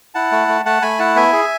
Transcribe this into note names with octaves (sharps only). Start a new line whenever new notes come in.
E4 F#5 A5
A3
A3
A3 F#5 A5
A3 G#5 B5
E4 F#5 A5
B3 E5 G#5
G#4